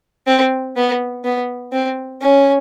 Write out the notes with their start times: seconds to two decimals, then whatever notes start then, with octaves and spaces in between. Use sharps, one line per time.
0.27 C4
0.76 B3
1.24 B3
1.73 C4
2.22 C#4